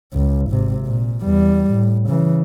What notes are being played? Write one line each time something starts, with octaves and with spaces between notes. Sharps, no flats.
C#2
G#1 C3
A#2
E2 G3
A2
C#3 E3